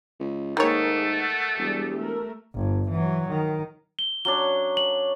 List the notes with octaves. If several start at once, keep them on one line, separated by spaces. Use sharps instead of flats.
C#2
G#2 D#3 A3 A#3 G#4 C#5
F#5
E1 G3 G4 G#4
A3 A#4
G1
E3 F#3
D#3
G7
F#3 C#4 D4 G7
F#7